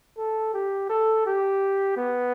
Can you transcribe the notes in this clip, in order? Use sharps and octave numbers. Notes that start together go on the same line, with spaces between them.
A4
G4
A4
G4
B3